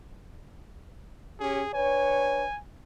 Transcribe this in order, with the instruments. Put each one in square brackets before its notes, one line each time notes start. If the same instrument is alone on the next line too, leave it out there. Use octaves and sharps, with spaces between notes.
[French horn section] C#4 G4 [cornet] G#4
[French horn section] D4 B4 C#5 [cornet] G#5